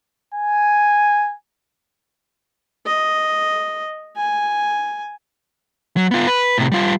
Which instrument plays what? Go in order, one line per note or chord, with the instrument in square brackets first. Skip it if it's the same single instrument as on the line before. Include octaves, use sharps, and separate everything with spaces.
[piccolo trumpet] G#5
[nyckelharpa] D#5
G#5
[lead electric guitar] F#3
B3 F4
B4
A2 C3
G3 F4